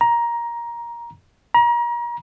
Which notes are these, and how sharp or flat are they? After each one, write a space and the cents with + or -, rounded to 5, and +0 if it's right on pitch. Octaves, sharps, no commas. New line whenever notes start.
A#5 +15
A#5 +35